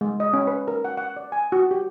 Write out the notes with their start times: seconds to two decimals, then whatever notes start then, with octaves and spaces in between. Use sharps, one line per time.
0.01 G#3
0.20 D#5
0.33 C#4
0.47 B4
0.68 A#4
0.85 F#5
0.97 F#5
1.16 D5
1.32 G#5
1.52 F#4
1.71 G4